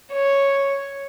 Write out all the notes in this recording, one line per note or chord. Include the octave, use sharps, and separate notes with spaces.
C#5